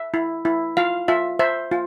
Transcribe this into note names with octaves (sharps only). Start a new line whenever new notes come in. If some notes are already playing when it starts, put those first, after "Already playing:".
Already playing: E5
E4
E4
F4 F5
F4 E5
C5 E5
F4